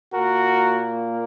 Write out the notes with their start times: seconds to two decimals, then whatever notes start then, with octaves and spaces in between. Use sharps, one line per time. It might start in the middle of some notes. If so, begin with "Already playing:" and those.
0.12 A#2 A#3 F#4 A#4